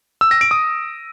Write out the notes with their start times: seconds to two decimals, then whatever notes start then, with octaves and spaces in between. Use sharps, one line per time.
0.21 E6
0.31 A#6
0.41 D7
0.51 D#6